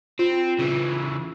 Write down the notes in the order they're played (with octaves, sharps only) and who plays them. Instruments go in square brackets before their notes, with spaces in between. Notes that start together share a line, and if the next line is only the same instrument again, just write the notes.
[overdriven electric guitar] C4 [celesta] F4
[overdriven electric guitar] C#3 E3